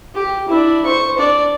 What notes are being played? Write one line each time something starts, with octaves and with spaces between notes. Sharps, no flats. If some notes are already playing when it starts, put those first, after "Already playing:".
G4
D4 E4
C5 C#6
D4 D5